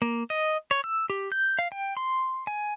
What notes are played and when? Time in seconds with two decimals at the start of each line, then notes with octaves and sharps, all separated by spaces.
0.02 A#3
0.30 D#5
0.71 C#5
0.84 E6
1.10 G4
1.32 G6
1.59 F5
1.72 G5
1.97 C6
2.47 G#5